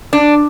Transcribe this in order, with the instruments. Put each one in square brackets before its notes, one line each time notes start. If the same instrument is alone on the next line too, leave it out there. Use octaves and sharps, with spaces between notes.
[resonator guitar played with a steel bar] D4